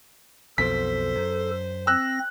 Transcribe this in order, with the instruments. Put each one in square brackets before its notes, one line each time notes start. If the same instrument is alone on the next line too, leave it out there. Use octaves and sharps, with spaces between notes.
[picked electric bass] B1 F2 B2 [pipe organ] A4 [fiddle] C5 [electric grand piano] B6
[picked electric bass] F#2
[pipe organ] C4 A#6 [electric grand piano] E6 F#6